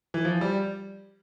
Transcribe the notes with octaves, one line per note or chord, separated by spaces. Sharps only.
E3
F3
G3